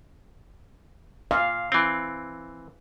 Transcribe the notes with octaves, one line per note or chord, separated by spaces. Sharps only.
A#2 F5
E3 C4